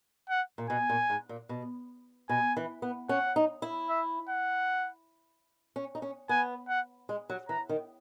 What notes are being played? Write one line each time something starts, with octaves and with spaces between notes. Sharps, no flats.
F#5
A#2
B2 G#5
A#2
G#2
A#2
B2
B2 G#5
E3
B3
C#4 F#5
D#4
E4
E5
F#5
C#4
D#4
C#4
B3 G#5
F#5
G#3
F#3
E3 A#5
D#3